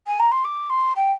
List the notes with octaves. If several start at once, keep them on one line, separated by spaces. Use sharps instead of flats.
G#5
A#5
C6
D6
C6
G5